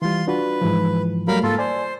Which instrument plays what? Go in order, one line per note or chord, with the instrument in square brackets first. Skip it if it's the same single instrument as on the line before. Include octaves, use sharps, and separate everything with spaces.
[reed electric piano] E3 G3 [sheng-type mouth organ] F4 C6
[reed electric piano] D4 F4 F#4 [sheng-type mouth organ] B4
[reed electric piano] G#2 E3 F3
[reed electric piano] F#3 G3 A3 [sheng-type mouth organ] A#4 F5 B5
[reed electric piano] G#2 A#3 C6 [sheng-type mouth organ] F4 A4
[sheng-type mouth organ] C5 [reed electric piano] D5 G#5